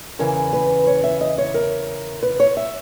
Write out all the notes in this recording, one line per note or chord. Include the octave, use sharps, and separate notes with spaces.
E2 C#3 E3 A#4
B4
C#5
E5
D#5
C#5
A#4
B4
C#5
E5